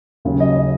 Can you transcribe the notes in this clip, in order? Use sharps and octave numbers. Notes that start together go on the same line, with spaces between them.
D#2 C#3 F#3
D#5
C#5